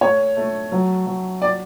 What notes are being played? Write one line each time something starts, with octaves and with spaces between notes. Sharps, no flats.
A3 C#5
A3
F#3
F#3
D5